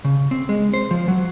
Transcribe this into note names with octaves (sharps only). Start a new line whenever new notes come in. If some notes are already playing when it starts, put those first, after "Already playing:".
C#3
C4
G#3
C5
F3
F#3